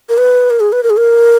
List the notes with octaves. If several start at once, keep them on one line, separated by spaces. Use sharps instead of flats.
A#4
B4
A#4
G#4
B4
A#4
G#4
A#4